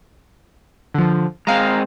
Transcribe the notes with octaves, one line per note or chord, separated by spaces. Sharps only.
D3 F3
G#3 C4 F5 A#5